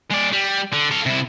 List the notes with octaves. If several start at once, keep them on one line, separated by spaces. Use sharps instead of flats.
G#3 D5
G3
D3
A4 F5
C3 E4